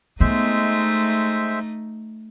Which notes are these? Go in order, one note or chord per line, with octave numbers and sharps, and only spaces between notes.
G#3 A3 B3 D#4 C5 E5